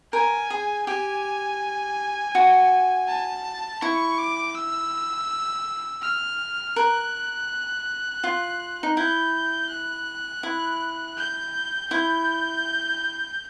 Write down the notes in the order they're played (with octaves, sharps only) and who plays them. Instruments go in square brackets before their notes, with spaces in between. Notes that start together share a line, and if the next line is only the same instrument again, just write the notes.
[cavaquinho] A#4 [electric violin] G#5
[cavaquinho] G#4
[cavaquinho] G4 [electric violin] G#5
[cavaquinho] F#4
[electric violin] A5
[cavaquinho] E4 [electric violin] C#6
[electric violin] D6
E6
F6
[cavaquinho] A#4 [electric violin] F#6
[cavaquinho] F4
D#4
[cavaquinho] E4 [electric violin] G6
[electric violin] F#6
[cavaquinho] E4
[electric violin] G6
[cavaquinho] E4 [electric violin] G6